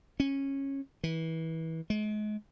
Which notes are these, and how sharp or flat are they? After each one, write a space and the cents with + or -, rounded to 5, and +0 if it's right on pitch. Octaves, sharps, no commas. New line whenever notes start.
C#4 -15
E3 -25
G#3 +35